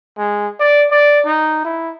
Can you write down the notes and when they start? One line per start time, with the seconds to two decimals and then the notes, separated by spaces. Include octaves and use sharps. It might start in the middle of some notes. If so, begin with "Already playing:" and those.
0.18 G#3
0.60 D5
0.91 D5
1.25 D#4
1.65 E4